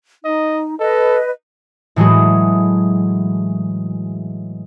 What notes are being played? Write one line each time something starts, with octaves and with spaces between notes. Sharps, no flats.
D#4 D#5
A4 B4 D#5
A2 E3 F#3 G#3 F#4 G#4